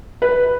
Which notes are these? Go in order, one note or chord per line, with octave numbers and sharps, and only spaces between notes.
B4